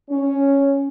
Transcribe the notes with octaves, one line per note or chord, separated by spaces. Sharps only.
C#4